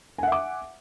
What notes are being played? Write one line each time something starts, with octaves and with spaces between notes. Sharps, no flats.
E5 F#5 G#5 D6